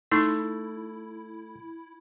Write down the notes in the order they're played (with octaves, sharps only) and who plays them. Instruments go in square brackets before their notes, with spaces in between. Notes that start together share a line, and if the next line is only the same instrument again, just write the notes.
[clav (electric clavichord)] A3 [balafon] D#4 [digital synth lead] E4